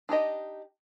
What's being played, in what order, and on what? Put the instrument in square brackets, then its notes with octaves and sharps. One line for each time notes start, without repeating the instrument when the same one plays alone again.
[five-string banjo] D4 D#4 G4 D#5